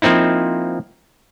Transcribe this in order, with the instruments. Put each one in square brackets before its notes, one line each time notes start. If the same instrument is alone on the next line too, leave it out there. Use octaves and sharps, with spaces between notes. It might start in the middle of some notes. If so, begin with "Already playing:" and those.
[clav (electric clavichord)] F3 A#3 C4 D#4 E4